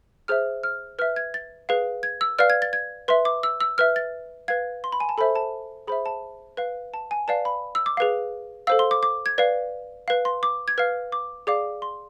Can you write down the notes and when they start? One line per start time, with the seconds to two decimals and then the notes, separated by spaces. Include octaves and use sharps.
0.28 G#4 C5 E5 F6
0.63 F6
0.99 B4 E5 F6
1.16 G#6
1.34 A6
1.69 G#4 B4 F5
2.03 G#6
2.21 E6
2.39 B4 D5 F5 F6
2.50 G#6
2.62 A6
2.73 G#6
3.08 B4 E5 C6
3.25 D6
3.43 E6
3.60 E6
3.78 B4 E5 F6
3.96 A6
4.48 B4 F5 G#6
4.84 C6
4.92 B5
5.00 G#5
5.09 A5
5.18 A4 C5 E5 B5
5.35 A5
5.87 G#4 C5 E5 B5
6.06 A5
6.57 B4 F5
6.94 A5
7.11 G#5
7.28 B4 D5 F5 A5
7.45 B5
7.75 E6
7.86 D6
7.97 G#4 B4 F5
8.67 A4 C5 F5 E6
8.79 C6
8.91 D6
9.03 D6
9.26 G#6
9.38 B4 D5 F5
10.08 B4 F5
10.25 C6
10.43 D6
10.68 G#6
10.78 B4 F5 F6
11.12 D6
11.47 G#4 D5 F5 D6
11.82 C6